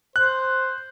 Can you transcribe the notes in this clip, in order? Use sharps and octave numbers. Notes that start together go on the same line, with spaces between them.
C5 F#6